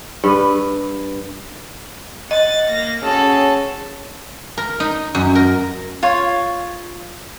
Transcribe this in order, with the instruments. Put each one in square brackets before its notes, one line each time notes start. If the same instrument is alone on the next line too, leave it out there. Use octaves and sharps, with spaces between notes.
[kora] G2 B4
[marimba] D#5 [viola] F#5 [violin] A6
[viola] A#3 [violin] A#6
[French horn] C#4 [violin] F#4 A4 [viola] G#4 A5
[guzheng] A#4
D#4
F#2
A#4
[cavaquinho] F4 C#5